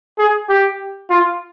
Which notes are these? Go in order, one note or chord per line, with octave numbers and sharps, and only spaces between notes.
G#4
G4
F4